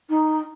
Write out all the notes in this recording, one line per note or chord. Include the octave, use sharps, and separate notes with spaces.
D#4